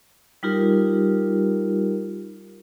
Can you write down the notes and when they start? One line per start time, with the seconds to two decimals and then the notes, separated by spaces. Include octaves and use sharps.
0.43 G3 D#4 F4 G4 A#4